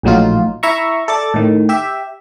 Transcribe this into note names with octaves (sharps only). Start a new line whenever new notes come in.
A#1 A2 F#3 D#4 F4
E4 E5 A#5 C#6
A4 D5 A6
A2 D#3
G4 E5